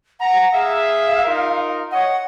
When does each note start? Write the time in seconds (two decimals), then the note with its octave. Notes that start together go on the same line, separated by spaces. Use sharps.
0.20 F#5 A#5
0.53 G#4 E5 F5
1.25 D#4 F4 A#4
1.92 C#5 D#5 F#5